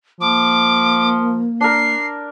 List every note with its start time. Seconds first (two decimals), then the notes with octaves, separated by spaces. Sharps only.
0.21 F3 A#3 D6
1.61 D4 A#4 C7